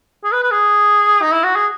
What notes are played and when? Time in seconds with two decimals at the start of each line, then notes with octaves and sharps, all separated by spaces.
0.24 G#4
0.32 B4
0.43 B4
0.51 G#4
1.22 D#4
1.33 E4
1.44 F#4
1.56 G#4